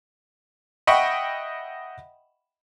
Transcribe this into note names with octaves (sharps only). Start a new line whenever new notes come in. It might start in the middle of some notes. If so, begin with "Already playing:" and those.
D#5 E5 F#5 G5 B5 C#6